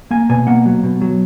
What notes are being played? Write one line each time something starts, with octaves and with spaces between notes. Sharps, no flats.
A#3 G#5
B2 G#5
A#3 F#5
F#3
B2
F#3